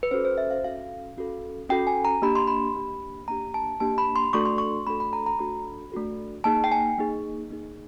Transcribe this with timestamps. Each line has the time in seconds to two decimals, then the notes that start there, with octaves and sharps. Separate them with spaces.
0.03 B4
0.11 C#4 F#4 A4 C5
0.25 C5
0.38 E5
0.50 F5
0.64 C#4 F#4 A4 F5
1.17 C#4 F#4 A4
1.69 C#4 F#4 A4 G5
1.87 G#5
2.05 A#5
2.22 A#3 D4 G4 B5
2.36 C6
2.47 B5
2.76 A#3 D4 G4
3.28 A#3 D4 G4 A#5
3.54 A5
3.80 A#3 D4 G4 A5
3.98 B5
4.16 C6
4.33 A3 D4 F#4 A4 C#6
4.45 C6
4.58 C#6
4.87 A3 D4 F#4 A4 B5
5.00 B5
5.13 A#5
5.26 A#5
5.39 A3 D4 F#4 A4 B5
5.92 A3 D4 F#4 A4
6.44 A#3 D#4 G#4 A5
6.64 G5
6.72 G#5
6.98 A#3 D#4 G#4
7.50 A#3 D#4 G#4